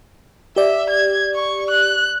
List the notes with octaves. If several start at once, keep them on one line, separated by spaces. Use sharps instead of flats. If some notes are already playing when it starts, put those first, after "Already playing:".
G4 D5 E5
G#6
C#6
F#6